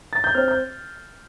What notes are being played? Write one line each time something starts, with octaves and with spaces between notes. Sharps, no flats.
A6
G6
C4 F6
G6